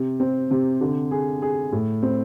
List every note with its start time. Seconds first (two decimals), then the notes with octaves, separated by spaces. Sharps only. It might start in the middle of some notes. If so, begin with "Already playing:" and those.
Already playing: C3
0.20 C4
0.51 C3
0.81 D3
1.11 G#4
1.42 G#4
1.72 A2
2.02 C4